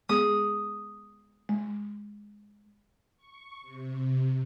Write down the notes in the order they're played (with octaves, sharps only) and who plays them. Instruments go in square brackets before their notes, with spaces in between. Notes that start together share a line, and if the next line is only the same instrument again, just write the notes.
[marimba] G#3 B3 G#4 [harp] D#6
[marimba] G#3
[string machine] C#6
C3